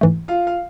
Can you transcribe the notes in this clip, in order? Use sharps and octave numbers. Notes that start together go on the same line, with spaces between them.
G#2 E3 A3
F4 F5
F5